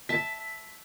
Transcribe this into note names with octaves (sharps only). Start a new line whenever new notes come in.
E5 A5 B6